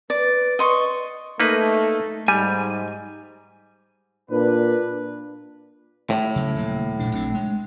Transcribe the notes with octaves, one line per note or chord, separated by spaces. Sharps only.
B4 D5
D#5 C6 C#6
A3 A#3 D#4 B4
G#2 G3 G#5
A#2 D4 B4
A2
C#3 F#3
D#1 F#3 A#3
E1 A#2 D4
A#1 C4 D4
G#3